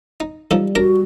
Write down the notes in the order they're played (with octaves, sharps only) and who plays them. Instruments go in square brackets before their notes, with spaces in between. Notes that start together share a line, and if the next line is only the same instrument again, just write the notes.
[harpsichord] D#4
[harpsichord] F3 D#4 A4 [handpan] G3
[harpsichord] D4 A#4 A#5 [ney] F#4